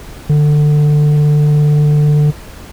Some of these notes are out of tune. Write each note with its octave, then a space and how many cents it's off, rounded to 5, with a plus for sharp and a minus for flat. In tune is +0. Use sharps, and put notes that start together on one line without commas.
D3 +20